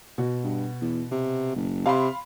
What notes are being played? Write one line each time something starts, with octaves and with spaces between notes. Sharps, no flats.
B2 F#4
G2
E2
C3
F#1
C3 F5 B5 C6